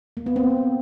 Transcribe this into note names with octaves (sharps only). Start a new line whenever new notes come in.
A#3
B3
C4